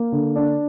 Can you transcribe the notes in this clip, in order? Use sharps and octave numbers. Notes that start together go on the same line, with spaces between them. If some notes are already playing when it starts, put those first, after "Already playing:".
Already playing: A#3
D3
D4